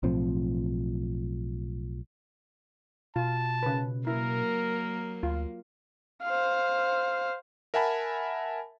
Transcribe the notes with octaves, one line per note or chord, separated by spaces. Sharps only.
B1 A2 F3 C4
B2 F4 A5
C#3 B4
F#3 A#3 E4 A#4
D2 F4
C5 F5
A#4 E5 F#5 G#5 A5 B5